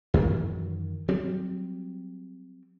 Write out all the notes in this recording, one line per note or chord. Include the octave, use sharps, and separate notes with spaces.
F#2 D#3 E3 F#3
F#3 G3 C4